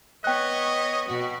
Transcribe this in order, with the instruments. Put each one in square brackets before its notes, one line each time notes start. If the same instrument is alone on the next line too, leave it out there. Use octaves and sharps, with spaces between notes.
[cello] B3 C#5 [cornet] D#5 [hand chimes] G5 F#6
[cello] B2 F#4